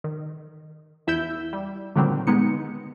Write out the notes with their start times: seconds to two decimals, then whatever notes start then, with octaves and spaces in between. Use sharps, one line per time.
0.04 D#3
1.07 E2 E4 E6 G6
1.53 G3
1.95 A#2 D3 D#3 F#3 G3 C4
2.27 G#3 B3 D#4 C#7